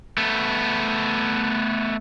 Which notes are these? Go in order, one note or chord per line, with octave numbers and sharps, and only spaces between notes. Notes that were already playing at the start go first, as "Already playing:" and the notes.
A3 B3